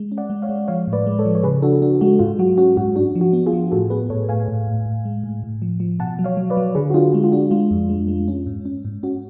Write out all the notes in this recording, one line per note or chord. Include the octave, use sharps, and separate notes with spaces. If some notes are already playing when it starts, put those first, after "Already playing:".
Already playing: G#3
C#4
D5 F#5
G#3
C#5 F5
G#3
F3 C#5 F5
A2
B4 D5
G#3
A4 C#5
F3
C#5
C#3 G#4 B4
D4 F#4 A4
D4 F#4
G#3 F#4
G#2 F4
F#3 F#4
C#4 F#4
G#2 F#4
D4 F#4
F3
F#4
B3
F4 G#4
F3
A2 F#4 A4
B3 G#4 B4
A2 A4 C#5
A2 F5 G#5
A2
A2
A2
G#3
A2
A2
F3
F3
B2 F#5 A5
F#3
C#5 F5
F#3
B4 D5
F#3
D3 G#4 B4
F#4
D4 F4 G#4
G#3 F4
F4
D4 F#4
G#3 F4
F2
G#3
G#3
C#4
G#2
C#4
G#2
C#4 F#4